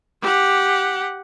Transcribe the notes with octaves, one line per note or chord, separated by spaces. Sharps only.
G4 F#5